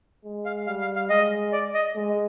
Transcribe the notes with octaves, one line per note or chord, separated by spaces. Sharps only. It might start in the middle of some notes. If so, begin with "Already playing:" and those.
G#3
F5
G3 F5
F5
F5
G#3 D#5
D5
D#5
G#3